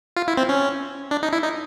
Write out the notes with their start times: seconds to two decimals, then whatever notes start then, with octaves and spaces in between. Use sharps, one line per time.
0.17 F4
0.28 E4
0.37 C4
0.49 C#4
1.11 D4
1.23 D#4
1.33 E4
1.43 D#4